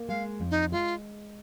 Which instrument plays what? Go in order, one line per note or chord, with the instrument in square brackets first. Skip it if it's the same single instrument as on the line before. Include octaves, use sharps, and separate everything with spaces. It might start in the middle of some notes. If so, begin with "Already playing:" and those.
Already playing: [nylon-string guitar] A#3
[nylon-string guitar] G#3 [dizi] F5
[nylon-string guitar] F2
[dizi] D#4
[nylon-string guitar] G#3 [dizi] F4